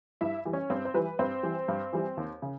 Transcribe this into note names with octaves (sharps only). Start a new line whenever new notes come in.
G2 E4 E5
E3 G3
C#4 C#5
G2 C4 C5
C5
E3 G3 B4
G2 C4 C5
E3 G3
G2
E3 G3
D#2
C#3